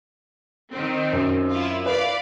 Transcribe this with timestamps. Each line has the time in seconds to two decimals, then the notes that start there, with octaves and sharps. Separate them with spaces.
0.71 D#3 C4
1.13 F#2
1.50 E4 F4
1.86 B4 D5 F5 B5